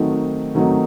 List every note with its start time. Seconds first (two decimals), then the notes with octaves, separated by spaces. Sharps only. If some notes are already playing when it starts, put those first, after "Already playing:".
Already playing: D#3 F#3 A3 C4 D#4
0.55 D#3 F#3 A3 C4 D#4